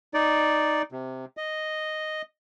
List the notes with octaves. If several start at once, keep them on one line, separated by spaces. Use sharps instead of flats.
D#4 D5
C3
D#5